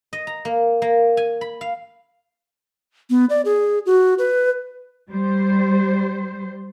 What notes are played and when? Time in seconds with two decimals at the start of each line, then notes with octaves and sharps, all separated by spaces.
0.13 D#5
0.27 A#5
0.45 A#3
0.82 A#3
1.17 G#5
1.41 B5
1.61 F5
3.10 B3
3.30 D5
3.45 G#4
3.86 F#4
4.19 B4
5.10 G3 C5